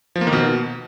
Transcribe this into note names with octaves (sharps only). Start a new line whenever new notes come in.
F3
A#3
D#3
B2